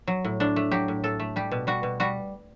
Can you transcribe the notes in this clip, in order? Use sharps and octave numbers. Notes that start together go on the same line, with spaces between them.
F#3
A2
A2 D4
A3
F#3 G4
A2
A2 A4
A3
G3 G4
B2
G3 F#4
B2
G3 F#4